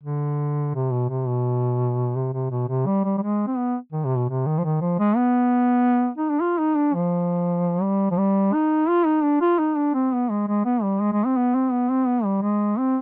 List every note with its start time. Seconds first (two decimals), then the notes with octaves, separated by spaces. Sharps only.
0.04 D3
0.75 C3
0.92 B2
1.09 C3
1.28 B2
2.16 C3
2.34 C3
2.51 B2
2.69 C3
2.87 G3
3.04 G3
3.18 G3
3.22 G#3
3.47 C4
3.57 B3
3.92 D#3
4.05 C3
4.17 B2
4.29 C3
4.46 D#3
4.58 F3
4.64 D#3
4.81 F3
4.99 G#3
5.17 B3
6.18 D#4
6.30 D4
6.41 F4
6.59 D#4
6.76 D4
6.94 F3
7.82 G3
8.11 F3
8.18 G3
8.54 D#4
8.89 F4
9.06 D#4
9.23 D4
9.41 F4
9.59 D#4
9.77 D4
9.95 C4
10.13 B3
10.31 G#3
10.48 G#3
10.65 B3
10.83 G3
11.01 G#3
11.13 G#3
11.25 C4
11.37 B3
11.55 C4
11.72 B3
11.90 C4
12.07 B3
12.25 G3
12.42 G#3
12.79 C4